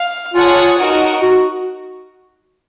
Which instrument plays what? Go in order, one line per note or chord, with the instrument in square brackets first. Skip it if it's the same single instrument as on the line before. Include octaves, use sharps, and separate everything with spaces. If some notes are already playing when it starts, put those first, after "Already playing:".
Already playing: [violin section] F5
[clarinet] F4 [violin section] G#4 C#5 F#5 A5
[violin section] D#4 F#4 A#4
[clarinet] F#4